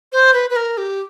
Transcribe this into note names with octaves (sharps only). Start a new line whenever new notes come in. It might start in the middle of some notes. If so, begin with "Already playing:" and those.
C5
B4
B4
A#4
G4